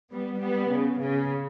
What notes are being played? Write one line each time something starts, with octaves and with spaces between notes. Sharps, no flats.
G3 B3
G3 B3
C#3
C#3